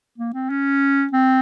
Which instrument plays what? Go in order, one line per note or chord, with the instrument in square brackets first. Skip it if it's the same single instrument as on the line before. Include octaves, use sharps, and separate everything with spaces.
[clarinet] A#3
C4
C#4
C4